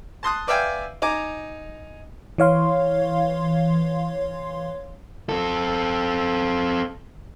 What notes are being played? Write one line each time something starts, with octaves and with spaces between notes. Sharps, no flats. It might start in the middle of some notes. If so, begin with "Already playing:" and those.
A5 C6 D#6 F#6
B4 D5 E5 F5 G5 G#5
D#4 G#5 A#5 D6
E3 C#5 F5 C6
C4 A4